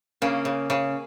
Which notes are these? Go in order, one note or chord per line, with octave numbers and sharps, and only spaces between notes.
C#3 A#3 C#4
C#3
C#3